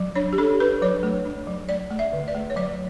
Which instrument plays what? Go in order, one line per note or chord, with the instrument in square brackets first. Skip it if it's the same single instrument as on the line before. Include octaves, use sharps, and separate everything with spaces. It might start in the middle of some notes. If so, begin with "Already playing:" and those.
Already playing: [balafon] F#3
D4 C#5
G4
D4 A4
D4 B4
F#3 C#5
A3
D4
F#3
A3 D5
A3
E5
D3
D5
A3
C#5
F#3 D5